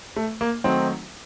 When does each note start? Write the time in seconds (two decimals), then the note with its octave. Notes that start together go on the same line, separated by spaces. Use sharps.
0.16 A3
0.41 A#3
0.64 D#3 F#3 A3 C4 D#4 F#4